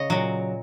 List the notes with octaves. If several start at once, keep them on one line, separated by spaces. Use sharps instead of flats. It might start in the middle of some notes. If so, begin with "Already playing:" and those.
Already playing: C#3 C#5 D#5
A#2 F#3